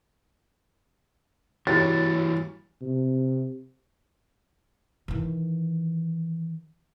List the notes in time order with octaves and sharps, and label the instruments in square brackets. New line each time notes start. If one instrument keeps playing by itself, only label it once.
[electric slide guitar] E3 G3 [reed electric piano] F#4 G4 C#5 [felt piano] A6
[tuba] C3
[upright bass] D#3 E3